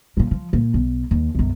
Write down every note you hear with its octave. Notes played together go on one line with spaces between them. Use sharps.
A#2 F#3
F3
A#2
B1
D#2
B1 F#2